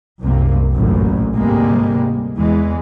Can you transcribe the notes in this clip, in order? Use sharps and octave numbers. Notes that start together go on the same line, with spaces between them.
C2 F#2 C3 A#3
A1 F#2 A#2 D3
D2 G#2 C3 G3 G#3 A#3
E2 E3 G#3